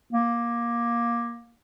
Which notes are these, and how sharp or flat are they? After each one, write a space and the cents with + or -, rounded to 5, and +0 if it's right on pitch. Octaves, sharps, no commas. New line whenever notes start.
A#3 +15